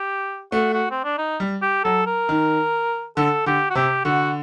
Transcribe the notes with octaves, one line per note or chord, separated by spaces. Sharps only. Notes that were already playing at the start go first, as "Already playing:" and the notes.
Already playing: G4
A3 F#4
F#4
C4
D4
D#4
G3
G4
F#3 A4
A#4
D#3
D3 A4
D3 G4
F#4
C3 G4
D3 F#4